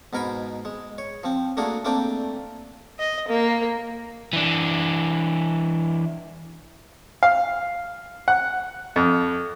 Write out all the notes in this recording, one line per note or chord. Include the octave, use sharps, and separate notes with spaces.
G#2 B2 A#4 G#5 B5
G#3
C#5
F3 C4
A3 A#3 D4 F#4 G#4
A3 A#3 C4 D4 G5 D6
D#5
A#3
E3 D4
F5
F#5
F2